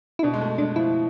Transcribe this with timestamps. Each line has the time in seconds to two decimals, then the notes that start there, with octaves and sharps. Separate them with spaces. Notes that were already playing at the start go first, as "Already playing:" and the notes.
0.19 E4
0.23 B2 D4
0.34 G#3
0.41 A3
0.58 G#3 D4
0.76 F3 E4